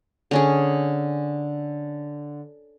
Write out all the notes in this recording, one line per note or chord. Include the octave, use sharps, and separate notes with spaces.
D3 C#4 G#4